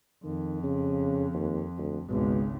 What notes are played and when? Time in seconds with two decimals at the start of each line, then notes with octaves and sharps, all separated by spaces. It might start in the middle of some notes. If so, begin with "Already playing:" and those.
0.24 F2 D#3
0.63 C#3
1.34 D#2
1.78 D2
2.09 G#1 C#2 B2